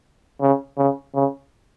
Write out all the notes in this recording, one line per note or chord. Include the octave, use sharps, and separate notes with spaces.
C#3
C#3
C#3